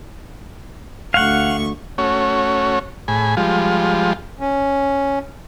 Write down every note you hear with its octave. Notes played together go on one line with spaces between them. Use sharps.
D2 F5 F#5 C#6
A3 C#4 F#4 C#5
A2 G#4 G#5 B5
F3 G3 G#3 F4
C#4